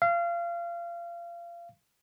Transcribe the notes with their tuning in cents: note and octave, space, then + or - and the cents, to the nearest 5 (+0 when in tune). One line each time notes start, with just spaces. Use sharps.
F5 -25